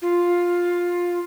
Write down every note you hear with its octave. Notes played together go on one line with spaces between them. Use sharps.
F4